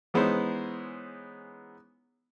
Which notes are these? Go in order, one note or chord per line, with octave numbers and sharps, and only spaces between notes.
E3 G#3 B3 C#4 D#4 C5